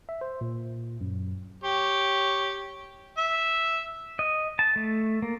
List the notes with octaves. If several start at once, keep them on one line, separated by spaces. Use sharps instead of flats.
E5
C5
A#2
F#2
G4 C#5
E5
D#5
A5
A3
A#3